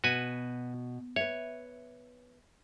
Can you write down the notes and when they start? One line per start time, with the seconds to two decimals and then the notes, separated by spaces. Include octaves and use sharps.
0.04 B2 F#4 B4 G#5
1.16 B4 C#5 E5